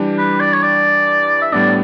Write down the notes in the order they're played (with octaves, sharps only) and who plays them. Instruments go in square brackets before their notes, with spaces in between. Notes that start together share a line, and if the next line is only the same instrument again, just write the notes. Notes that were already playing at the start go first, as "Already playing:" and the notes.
Already playing: [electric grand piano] E3 G3 D4 G4
[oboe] B4
D5
C#5
D5
E5
[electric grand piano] A2 G3 B3 D4 [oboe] D5